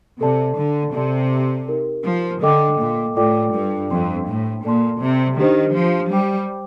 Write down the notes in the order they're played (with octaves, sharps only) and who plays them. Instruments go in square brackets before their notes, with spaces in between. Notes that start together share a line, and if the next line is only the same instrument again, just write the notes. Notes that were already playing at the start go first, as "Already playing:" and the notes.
[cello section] C3 [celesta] A4 D5 A5
[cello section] D3
[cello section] C3 [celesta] A4 D5 A5 C6
[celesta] D#4 G4 A#4
[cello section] F3
[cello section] D3 [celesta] A4 D#5 G5 D6
[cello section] A#2
[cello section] A2 [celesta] F4 A4 D5 G5 D6
[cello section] G2
[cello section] F2 [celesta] D4 A4 C5 G5 C6
[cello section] A2
[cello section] A#2 [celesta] A4 D5 A5 C6
[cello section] C3
[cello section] D#3 [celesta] D4 G4 C5
[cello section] F3
[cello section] G3 [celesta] C5 G5 D6